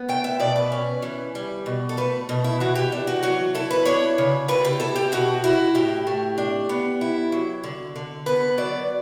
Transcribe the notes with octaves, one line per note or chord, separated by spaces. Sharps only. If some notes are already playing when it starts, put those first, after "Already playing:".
Already playing: B3
A3 G5
E5
B2 D5
B4
C#4
E3
G3
B2
A4
A3 B4
B2
E4
E3 F#4
G4
D4
F#4
F#3 F#4
E4 A4
B4
D4 C#5
C#3
A2 B4
G4
E4 A4
G4
B2 F#4
E4 F#4
A2 G4
A3
D4
B3
E4
F#3
D3
D3
B3 B4
F#3 D5